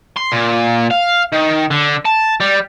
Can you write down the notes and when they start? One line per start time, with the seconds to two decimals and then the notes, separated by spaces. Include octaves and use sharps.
0.17 C6
0.32 A#2
0.91 F5
1.32 D#3
1.71 D3
2.05 A5
2.40 G3